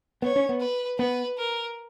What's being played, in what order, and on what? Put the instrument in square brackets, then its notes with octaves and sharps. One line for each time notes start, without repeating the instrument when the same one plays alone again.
[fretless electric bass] B3 [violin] C#5
[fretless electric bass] C#4
B3
[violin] B4
[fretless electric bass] B3 [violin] B4
[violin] A#4